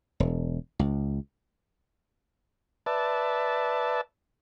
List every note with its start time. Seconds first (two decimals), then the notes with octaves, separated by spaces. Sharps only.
0.20 E1
0.79 C#2
2.86 B4 D5 E5 A5